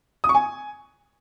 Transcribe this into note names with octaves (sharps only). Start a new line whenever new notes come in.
D#6
C#6
G#5